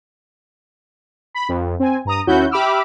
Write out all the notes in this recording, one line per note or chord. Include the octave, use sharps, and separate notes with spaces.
B5
F2
C4 G#5
G2 A#5 D#6
D#2 C#4 E4 F#4 G6
G4 E5 B5 D6 E6 F6